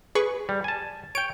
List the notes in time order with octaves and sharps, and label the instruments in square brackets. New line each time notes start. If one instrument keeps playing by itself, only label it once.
[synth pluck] G#4 B4 C#6
[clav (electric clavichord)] G3
G#5 A5
[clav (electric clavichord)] C#5 G5 [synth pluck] D7